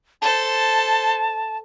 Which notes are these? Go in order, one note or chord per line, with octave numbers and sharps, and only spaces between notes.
A4 C5 A5